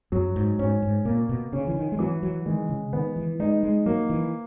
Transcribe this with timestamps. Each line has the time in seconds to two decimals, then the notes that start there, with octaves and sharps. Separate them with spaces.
0.12 F#2 F#3
0.36 G#2
0.59 G#2 C#4
0.82 G#2
1.05 A#2 A#3
1.29 B2
1.53 C#3 C#4
1.67 E3
1.76 D#3
1.92 G#3
1.99 E3 F#3
2.23 F#3
2.46 D#3 G#3
2.70 C#3
2.93 D#3 B3
3.16 E3
3.39 G#3 D#4
3.63 G#3
3.86 F#3 A#3
4.10 E3